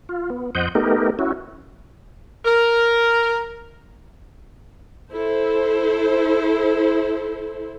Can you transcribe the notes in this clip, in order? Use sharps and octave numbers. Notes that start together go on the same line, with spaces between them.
F4
B3
F2 C5 D#5 F#5 G6
A3 B3 D#4 G4 A#4
C#4 E4 F#4
A#4
E4 A4 C5